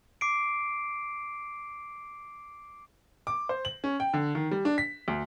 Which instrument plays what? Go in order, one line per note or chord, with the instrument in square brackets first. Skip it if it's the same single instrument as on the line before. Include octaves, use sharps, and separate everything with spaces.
[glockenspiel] D6 C7 D7
[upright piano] D6
C5
F#7
C#4
G5
D3
D#3
G3
D4
B6
D2